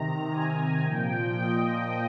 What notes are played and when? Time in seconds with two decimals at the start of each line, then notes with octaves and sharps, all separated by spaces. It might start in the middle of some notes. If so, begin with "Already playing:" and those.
Already playing: C3 D#3 A#5
0.31 G#5
0.85 A#2 F3 G5
1.40 D#5